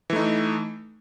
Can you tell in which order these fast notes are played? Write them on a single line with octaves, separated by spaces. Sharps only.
E3 A3 D#4